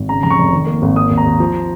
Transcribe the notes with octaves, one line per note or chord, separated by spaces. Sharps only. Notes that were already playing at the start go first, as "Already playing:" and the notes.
Already playing: G#1
C#3 A#5
F1 A#5
C#6
F1
D#3
A#3
G#1
A#3 D#6
D#2
A#5
D#2
F3